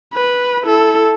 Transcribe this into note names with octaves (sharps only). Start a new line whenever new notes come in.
B4
E4 A4